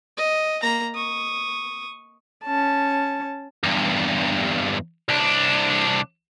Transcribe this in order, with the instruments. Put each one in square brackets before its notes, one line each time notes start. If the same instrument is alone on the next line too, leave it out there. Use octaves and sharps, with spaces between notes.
[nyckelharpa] D#5
A#3 A#5
C#6 D#6
[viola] C#4 A5
[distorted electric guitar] E2 G2
C2 D4